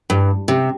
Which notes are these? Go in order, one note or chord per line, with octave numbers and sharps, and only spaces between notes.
G2
C3